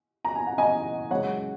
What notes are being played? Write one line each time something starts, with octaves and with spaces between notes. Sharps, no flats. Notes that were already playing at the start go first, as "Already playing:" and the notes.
A#5
G#5
F#5
D#5 G#5
F#2 C#3 G#3 C#5 F#5